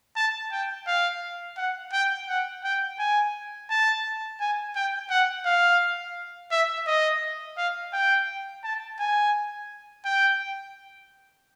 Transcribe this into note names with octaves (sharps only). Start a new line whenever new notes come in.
A5
G5
F5
F#5
G5
F#5
G5
G#5
A5
G#5
G5
F#5
F5
E5
D#5
F5
G5
A5
G#5
G5